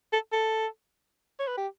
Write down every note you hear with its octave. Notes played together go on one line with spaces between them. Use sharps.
A4
A4
C#5
B4
G4